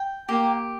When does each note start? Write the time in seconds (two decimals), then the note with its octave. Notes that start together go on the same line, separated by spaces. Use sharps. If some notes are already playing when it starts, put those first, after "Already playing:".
Already playing: G5
0.29 A#3 G4